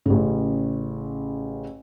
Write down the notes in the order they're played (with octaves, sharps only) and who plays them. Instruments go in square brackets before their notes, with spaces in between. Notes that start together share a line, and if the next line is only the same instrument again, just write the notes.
[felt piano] A1 C#3